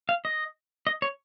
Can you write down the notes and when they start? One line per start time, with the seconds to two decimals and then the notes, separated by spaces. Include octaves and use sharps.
0.09 F5
0.25 D#5
0.87 D#5
1.02 C#5